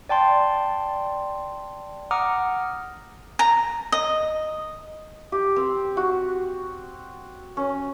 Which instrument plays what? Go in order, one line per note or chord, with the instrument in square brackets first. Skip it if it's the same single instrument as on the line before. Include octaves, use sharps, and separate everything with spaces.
[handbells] D5 G5 A5 C6
F#5 A#5 D6 D#6 F6
[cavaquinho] A#5
D#5
[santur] G4
C4
F#4
C#4